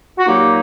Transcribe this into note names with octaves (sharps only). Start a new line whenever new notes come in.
F#4
A#2 F#3 A#3 D#4 G4